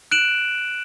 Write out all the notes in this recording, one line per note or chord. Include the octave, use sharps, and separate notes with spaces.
F#6 D7 E7 F#7